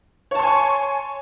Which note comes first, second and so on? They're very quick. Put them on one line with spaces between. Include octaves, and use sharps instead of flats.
C#5 A5 C6 G#5 C#6